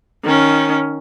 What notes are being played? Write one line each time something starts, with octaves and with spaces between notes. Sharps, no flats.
D#3 C#4